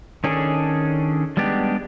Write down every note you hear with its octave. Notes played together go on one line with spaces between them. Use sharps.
D#3 C#4 D4 G#4 A4
G3 G#3 B3 D4 G4